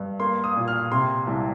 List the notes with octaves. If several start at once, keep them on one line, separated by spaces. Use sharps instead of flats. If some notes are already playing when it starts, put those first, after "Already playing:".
Already playing: G2
A#3 C6
D#6
A#2
F6
C3 C6
C2